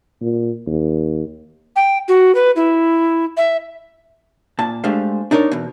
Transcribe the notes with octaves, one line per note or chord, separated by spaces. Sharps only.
A#2
D#2
G5
F#4
B4
E4
E5
A#2 A5
G#3 A3 D4 G4 C5 F5
D4 D#4 A#4 C#5 D5
E2 B2